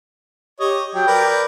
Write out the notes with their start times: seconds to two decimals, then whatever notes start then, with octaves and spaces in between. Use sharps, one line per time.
0.60 G4 C#5 D#5
0.95 F#3 G5
1.07 A#4 B4 D5